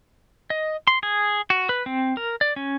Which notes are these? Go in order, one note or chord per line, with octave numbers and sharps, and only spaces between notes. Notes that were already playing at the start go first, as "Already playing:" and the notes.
D#5
C6
G#4
F#4
B4
C4
A#4
D5
C#4